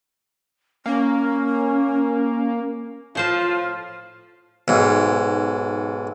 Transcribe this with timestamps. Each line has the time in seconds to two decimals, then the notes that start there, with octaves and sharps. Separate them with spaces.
0.86 A#3 C#4
3.15 A2 F3 F4 C5 A5
4.68 B1 G#2